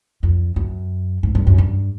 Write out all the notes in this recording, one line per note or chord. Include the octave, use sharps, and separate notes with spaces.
F2
F#2
G#2
G2
F#2
G2